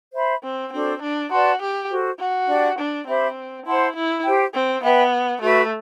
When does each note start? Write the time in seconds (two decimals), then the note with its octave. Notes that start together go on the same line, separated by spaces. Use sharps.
0.14 C5 E5 B5
0.43 C4
0.72 C4 D4 F#4 A4 C5
1.02 D4
1.31 F#4 B4 D5 A5 C6
1.61 G4
1.90 F#4 A4 C5
2.19 F#4
2.48 D4 G4 D5 G5
2.79 D4
3.07 C4 G4 C5 E5 B5
3.66 E4 C5 F#5 A5 C6
3.96 E4
4.24 G4 C5 G5
4.54 C4
4.83 B3 B4 E5 G5 B5
5.41 A3 F#4 B4 E5 B5